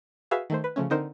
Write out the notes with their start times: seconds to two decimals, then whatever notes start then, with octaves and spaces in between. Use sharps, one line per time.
0.31 F#4 G#4 B4 E5 F5
0.50 D#3 A3 C5
0.64 B4
0.76 C#3 F3 A3 C#4
0.90 D3 C4 D#4 A#4 C5